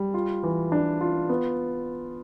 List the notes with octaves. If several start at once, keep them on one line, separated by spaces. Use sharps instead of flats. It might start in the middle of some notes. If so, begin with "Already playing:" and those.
Already playing: G3
F4
E3
D4
F4
B3